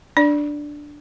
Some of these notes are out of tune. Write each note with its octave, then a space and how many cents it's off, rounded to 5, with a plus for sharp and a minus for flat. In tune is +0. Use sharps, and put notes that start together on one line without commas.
D4 +0 D5 +0